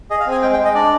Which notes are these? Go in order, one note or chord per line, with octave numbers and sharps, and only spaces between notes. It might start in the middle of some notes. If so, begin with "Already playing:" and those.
G#4 D#5
F5
C4 G#5
G#3 G5
G5
G#3
D#5
D4 D5